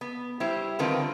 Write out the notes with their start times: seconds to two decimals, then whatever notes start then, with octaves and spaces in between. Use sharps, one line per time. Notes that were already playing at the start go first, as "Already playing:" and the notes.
0.01 B3
0.40 G3 E4 C5
0.79 D3 D#3 C4 F4 A#4 B4